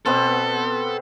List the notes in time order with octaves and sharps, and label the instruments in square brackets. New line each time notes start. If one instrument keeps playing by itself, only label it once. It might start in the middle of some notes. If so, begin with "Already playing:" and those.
[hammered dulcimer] B2 B3 C4 [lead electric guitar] A4